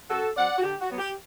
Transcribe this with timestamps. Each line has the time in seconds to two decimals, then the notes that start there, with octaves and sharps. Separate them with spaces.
0.10 F#2 F#4 A4
0.36 F#3 C4 D5 F#5
0.58 F#4
0.63 D3 G4
0.81 F#4
0.90 F#3 B3
0.98 G4